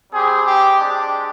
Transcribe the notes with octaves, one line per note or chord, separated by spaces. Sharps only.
G3 C4 G4 G#4
G4
G#3 D4 G4